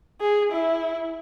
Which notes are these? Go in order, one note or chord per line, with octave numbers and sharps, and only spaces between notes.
G#4
E4